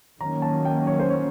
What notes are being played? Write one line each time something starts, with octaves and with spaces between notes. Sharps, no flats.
D#3 F#3 A#3 C#4 A#5
A5
G5
C#5
C5
C#5